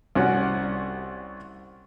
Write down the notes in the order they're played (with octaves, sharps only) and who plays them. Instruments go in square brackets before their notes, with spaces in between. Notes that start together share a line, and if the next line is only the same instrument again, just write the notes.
[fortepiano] C2 C#4 F#4 F#5